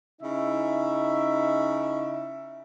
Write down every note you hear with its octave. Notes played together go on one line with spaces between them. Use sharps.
C#3 D#4 E4 E5